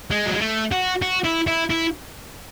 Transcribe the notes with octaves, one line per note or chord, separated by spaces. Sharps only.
G#3
F#3
G#3
A3
F#4
F#4
E4
E4
E4